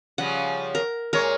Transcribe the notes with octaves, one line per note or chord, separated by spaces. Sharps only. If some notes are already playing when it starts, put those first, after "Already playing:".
C#3 F3 G3 F#5
A#4
A#2 G#3 A#4 C#5